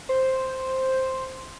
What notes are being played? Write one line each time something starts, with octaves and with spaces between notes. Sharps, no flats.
C5